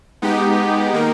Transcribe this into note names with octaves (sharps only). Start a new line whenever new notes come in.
G#3 B3 D#4 G4
D#3 A#3 D#4 A#4